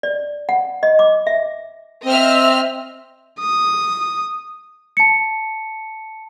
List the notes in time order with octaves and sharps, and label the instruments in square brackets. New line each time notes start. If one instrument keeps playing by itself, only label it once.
[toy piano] D5
F#5
D#5
D6
E5
[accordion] C4 [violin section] D#5 E5 F6
[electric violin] D#6
[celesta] A5 C#7